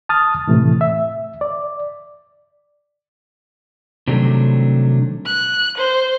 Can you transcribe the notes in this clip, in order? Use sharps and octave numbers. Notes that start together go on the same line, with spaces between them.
A5 D#6 F6 A6
A2 C3 E3 A3
E5
D5
C3 D#3 F#3 G3 A3 D4
F#6
C5